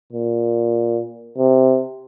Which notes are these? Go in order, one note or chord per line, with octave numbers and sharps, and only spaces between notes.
A#2
C3